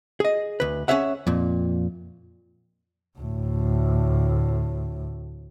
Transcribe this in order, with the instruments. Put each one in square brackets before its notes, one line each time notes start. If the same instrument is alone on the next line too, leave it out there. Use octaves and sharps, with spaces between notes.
[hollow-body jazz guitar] G#4 D#5
D2 B4
C#4 G#4 C#5 E5 F#5
F2 A#2
[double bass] D2 A2